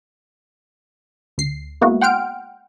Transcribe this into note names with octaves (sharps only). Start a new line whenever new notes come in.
D2 C7
G#3 A#3 B3 E4 F#4
F#5 G5 C6 F6 D7